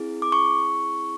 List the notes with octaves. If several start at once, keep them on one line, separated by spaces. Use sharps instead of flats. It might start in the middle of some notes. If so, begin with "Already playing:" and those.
Already playing: C4 E4 G#4
D6
C#6